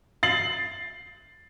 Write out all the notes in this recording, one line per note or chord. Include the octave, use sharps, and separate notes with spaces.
A6 C7 F#7